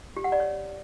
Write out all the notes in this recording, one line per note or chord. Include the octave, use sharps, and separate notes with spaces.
G4
F#5
D5
C#5